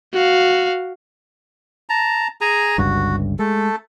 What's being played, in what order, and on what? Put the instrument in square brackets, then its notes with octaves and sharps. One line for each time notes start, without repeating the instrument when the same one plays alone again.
[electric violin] F#4 F5
[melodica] A5 A#5
G#4 G#5 A#5
[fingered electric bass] G1 C#2 G2 [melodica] F#4
[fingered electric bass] G#3 [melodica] A3 A4